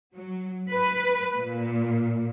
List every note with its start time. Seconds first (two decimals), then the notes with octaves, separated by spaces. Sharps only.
0.14 F#3
0.72 B4
1.38 A#2